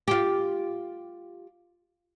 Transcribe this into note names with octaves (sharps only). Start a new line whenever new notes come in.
F4 G4